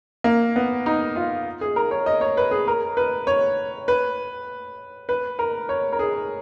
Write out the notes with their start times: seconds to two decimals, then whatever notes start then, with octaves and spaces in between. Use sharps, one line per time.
0.24 A#3
0.56 B3
0.86 D#4
1.16 F4
1.61 G#4
1.76 A#4
1.91 C#5
2.06 D#5
2.21 C#5
2.37 B4
2.51 G#4
2.68 A#4
2.97 B4
3.27 C#5
3.88 B4
5.09 B4
5.39 A#4
5.69 C#5
5.92 A#4
5.99 G#4